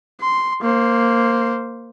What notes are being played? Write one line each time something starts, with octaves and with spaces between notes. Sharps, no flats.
C6
A#3 C5